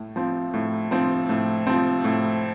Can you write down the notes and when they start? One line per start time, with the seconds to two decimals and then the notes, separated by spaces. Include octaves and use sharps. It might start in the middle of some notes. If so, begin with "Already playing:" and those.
Already playing: A2
0.16 F3 C4
0.54 A2
0.91 F3 C4
1.29 A2
1.67 F3 C4
2.04 A2